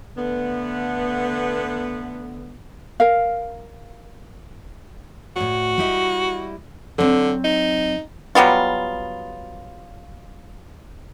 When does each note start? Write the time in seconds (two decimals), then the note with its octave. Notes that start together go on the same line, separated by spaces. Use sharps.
0.18 D3 A3 B3
3.00 A#4 F5
5.36 A2 F#4 D5
5.78 G3 E4 D#5
6.98 D3 F#3 C4
7.44 D#4
8.35 F#3 G3 B3 F4